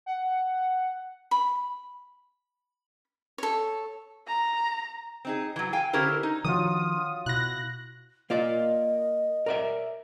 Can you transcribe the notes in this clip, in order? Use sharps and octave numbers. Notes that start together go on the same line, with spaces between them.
F#5
B5
A4 C#5
A#5
C4 D#4 G#4
E3 F#3
F5 G5 G#5
D3 C#4 E4 G4 A#4 C5
D#4
D#3 F3 D4 F4 F#4 C#5 D#6
B2 E4 F#6 A#6
A#3 F4 D5 D#5
A#4 D5 E5